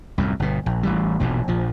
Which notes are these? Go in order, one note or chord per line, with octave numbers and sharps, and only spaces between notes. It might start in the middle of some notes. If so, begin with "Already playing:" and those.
C2 F#2 A2
G1 B2
A#1
A1 E3 G3
E1 A#1 G#2 B2
A#1 F3